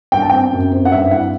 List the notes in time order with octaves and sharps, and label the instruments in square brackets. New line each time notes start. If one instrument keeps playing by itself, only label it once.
[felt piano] G2 [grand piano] G5
[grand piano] A5
[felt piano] C4 [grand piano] G5
[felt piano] F#2
C4
[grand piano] F#5
[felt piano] G2 [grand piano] E5
[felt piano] E4 [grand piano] F#5